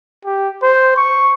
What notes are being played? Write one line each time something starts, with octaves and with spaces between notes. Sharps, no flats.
G4
C5
C#6